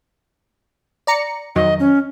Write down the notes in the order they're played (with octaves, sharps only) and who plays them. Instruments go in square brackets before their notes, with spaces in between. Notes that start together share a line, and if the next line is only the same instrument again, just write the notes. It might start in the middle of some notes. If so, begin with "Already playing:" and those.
[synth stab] D5 A#5 C#7
[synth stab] F2 D#3 F#3 [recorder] D#5
[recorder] C#4